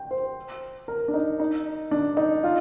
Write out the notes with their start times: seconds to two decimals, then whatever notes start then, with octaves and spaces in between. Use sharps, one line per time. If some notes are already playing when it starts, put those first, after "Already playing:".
Already playing: G5
0.11 C5
0.88 A#4
1.08 D4
1.14 D#4
1.40 D#4
1.91 D4
2.17 D#4
2.44 F4